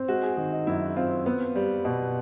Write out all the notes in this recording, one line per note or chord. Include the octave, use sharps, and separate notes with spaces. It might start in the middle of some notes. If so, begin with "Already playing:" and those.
Already playing: C4
G#3 F#4
G#4
D#3 G#4
D#4
F#2 E4
C4 F4
B3
G3
B2